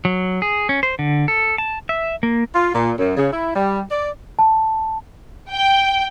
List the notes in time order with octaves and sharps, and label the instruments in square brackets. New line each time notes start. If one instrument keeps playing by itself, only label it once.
[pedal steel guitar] F#3
G#4
C#4
C5
D3
A4
A5
E5
A#3
[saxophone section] F4
A#2
F#2
C#3
E4
G3
D5
[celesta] A5
[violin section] G5